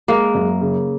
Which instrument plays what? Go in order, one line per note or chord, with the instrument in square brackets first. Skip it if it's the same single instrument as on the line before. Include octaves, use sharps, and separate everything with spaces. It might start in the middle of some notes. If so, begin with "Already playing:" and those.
[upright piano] G#3 [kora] A#3
[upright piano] F#2
C#3